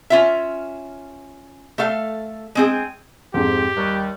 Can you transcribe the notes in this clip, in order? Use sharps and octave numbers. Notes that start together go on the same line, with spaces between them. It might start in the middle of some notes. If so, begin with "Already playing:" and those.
C#4 F4 E5
A3 A4 F5
G#3 C4 G#4
F2 G#2 G4
D#2 G3 C#6 F#6